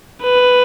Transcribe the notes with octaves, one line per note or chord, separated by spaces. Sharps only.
B4